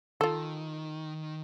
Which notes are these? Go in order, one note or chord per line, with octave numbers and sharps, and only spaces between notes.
D#3 F4 A4